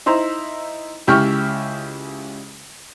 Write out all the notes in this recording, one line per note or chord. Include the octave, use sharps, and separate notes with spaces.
D#4 E4 C5 A#5
C#2 E4 G4 G5 C#6 F6